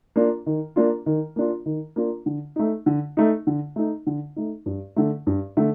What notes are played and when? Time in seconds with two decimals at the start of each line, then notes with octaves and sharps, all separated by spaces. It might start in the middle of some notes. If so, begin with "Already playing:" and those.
0.16 A#3 D4 F4
0.46 D#3
0.76 A#3 D4 F4
1.06 D#3
1.36 A#3 D4 F4
1.66 D#3
1.96 A#3 D4 F4
2.26 D3
2.56 A3 D#4
2.86 D3
3.17 A3 D#4
3.47 D3
3.76 A3 D#4
4.07 D3
4.36 A3 D#4
4.66 G2
4.96 D3 A3
5.27 G2
5.57 D3 A3